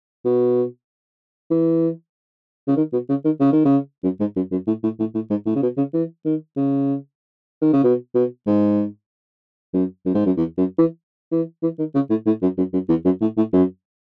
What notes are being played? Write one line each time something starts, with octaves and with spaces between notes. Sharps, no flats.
B2
E3
C#3
D#3
B2
C#3
D#3
C#3
D#3
C#3
F#2
G#2
F#2
F#2
A2
A2
A2
A2
G#2
A2
C#3
B2
C#3
E3
D#3
C#3
D#3
C#3
B2
B2
G#2
F#2
F#2
G#2
F#2
E2
F#2
E3
E3
E3
D#3
C#3
A2
A2
F#2
F#2
F#2
E2
F#2
A2
A2
F#2